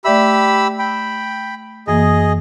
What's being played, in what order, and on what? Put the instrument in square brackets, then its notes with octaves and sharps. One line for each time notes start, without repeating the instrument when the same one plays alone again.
[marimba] A3 D5 E5 [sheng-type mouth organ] G4 B5 E6
[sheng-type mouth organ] G5 B5
[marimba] F#2 E3 A#3 [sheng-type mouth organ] G#4 D#5